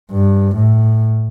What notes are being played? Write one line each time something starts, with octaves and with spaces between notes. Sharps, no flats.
G2
A2